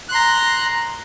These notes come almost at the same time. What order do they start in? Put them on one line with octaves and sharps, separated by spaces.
F#6 C6 A#5